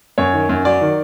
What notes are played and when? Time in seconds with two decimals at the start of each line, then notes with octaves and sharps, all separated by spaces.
0.18 F#2 C#5
0.33 D#3
0.49 F#2
0.65 F#3 D5
0.81 D#3